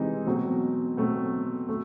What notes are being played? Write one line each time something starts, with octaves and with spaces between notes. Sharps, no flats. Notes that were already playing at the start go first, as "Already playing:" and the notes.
Already playing: C3 E3 G#3 C4 D#4
B2 F#3 A3 C4
B2 F#3 A3 C4
A3